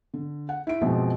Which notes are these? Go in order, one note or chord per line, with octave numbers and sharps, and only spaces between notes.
D3
F#5
E4 D7
F#2 B2 F3 F#3 G#3 C4